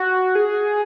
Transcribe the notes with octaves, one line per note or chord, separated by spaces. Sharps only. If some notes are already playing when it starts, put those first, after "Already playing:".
Already playing: F#4
G#4